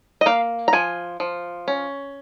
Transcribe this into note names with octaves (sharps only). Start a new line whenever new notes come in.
D#5
A#3 F5
A#5
F3 G#5
F3
C#4